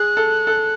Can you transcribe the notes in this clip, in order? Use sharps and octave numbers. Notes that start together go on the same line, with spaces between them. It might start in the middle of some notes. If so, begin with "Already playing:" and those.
Already playing: G#4 F#6
A4
A4